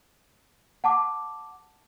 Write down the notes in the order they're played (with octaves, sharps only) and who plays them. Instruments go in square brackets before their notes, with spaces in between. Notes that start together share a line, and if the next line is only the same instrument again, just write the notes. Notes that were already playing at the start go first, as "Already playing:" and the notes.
[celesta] F#5 A5 D6